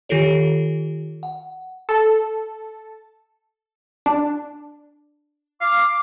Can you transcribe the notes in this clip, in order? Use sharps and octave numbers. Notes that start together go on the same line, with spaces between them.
D#3 F4 G4 A4 C#5
F#5
A4
D4
F5 D6